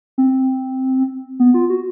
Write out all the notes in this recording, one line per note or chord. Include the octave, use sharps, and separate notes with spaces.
C4
B3
F4
F#4